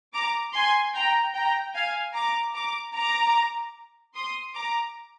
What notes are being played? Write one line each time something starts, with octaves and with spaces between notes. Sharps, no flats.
A#5 D6
G#5 C6
G5 A#5
G5 A#5
F5 G#5
A#5 D6
A#5 D6
A#5 D6
C6 D#6
A#5 D6